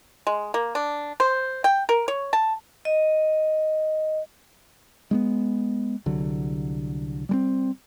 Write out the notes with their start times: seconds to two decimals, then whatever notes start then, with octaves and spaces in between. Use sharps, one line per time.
0.27 G#3
0.54 A#3
0.75 D4
1.20 C5
1.64 G5
1.89 A#4
2.08 C#5
2.33 A5
2.85 D#5
5.11 G#3 A#3 B3
6.06 C2 D3 F#3
7.29 G3 G#3 C4